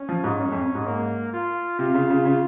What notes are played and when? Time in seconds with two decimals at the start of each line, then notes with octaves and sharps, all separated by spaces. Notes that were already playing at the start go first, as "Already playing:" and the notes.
Already playing: C#4
0.09 F3
0.24 G#2
0.40 F#2
0.52 F2
0.75 G#2
0.87 A#3
1.33 F4
1.79 C3 F4
1.94 C#3
2.10 C#3
2.25 C#3